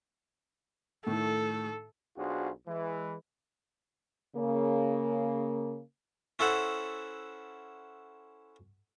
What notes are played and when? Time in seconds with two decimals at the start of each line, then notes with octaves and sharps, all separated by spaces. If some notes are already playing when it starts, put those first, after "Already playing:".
1.07 A2 D#3 A3 A4
2.17 B1 D4 F4 F#4 G#4 C5
2.67 E3 G#3
4.36 C#3 A#3
6.39 C#4 E4 A4 C5 F#5